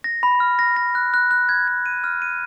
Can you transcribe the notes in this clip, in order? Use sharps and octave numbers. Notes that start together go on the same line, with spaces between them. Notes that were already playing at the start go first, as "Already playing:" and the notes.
A#6
B5
F6
A#6
A#6
F#6
F#6
F#6
G#6
G#6
D#7
F6
D#7